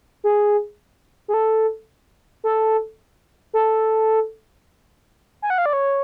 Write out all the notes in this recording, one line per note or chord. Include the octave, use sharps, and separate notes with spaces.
G#4
G#4
A4
A4
A4
G#5
F#5
F5
D5
C#5